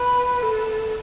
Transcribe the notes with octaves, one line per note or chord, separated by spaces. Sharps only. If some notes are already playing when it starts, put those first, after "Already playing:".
Already playing: B4
A4